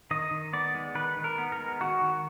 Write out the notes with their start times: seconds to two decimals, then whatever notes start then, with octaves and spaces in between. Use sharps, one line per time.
0.11 D#3 D#5
0.31 D#3
0.53 B3 D5
0.75 G#3
0.95 D#3 B4
1.17 D#3
1.24 A#4
1.38 B3
1.52 A#4
1.59 G#3
1.80 D#3 F#4
2.02 D#3